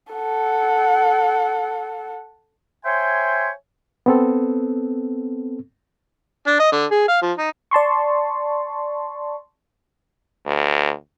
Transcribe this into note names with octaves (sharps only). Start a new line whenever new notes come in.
A4 F#5
C5 C#5 E5 G5 G#5 C6
B3 C4 A4
D4
D#5
D3
G#4
F5
F3
D#4
D5 A5 C6 C#6
D2